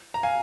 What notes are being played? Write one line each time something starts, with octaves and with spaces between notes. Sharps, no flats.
A#5
F5 G#5